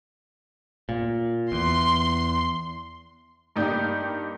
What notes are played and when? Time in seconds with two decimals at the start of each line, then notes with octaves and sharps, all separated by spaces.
0.89 A#2
1.52 E2 C6
3.56 G2 A#3 D#4 G4 D5 G6